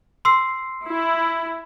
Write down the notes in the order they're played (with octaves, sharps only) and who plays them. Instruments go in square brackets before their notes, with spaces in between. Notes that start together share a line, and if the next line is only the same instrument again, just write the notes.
[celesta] C6 E6 C7
[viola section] E4